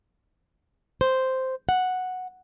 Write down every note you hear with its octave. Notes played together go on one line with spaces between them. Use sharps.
C5
F#5